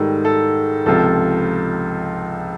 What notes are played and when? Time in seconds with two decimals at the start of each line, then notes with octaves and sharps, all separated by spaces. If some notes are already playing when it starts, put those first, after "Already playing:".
Already playing: G#2 D#3 G3 A4
0.25 A4
0.86 C#2 C3 F3 A4